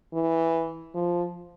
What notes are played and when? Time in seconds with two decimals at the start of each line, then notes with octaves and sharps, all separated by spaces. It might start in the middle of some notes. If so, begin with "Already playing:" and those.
0.14 E3
0.95 F3